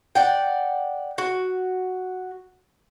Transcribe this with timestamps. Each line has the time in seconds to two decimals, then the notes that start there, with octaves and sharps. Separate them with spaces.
0.15 D5 F#5 G5
1.18 F#4